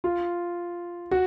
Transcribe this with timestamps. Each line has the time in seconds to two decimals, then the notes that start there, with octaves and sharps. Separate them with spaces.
0.04 F4
1.11 F#4